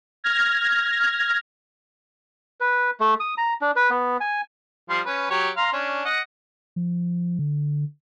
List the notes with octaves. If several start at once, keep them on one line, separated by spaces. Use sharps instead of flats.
F6 G#6 A#6
B4
A3
D#6
A#5
D4
B4
B3
G#5
F3 G3 C6
C#4 B4
F#3 G4 C#5
F5 A#5 C6
C#4 D4
D#5 F#5
F3
D3